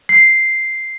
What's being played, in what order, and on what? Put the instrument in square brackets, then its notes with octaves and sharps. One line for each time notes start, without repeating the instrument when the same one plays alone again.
[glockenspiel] C7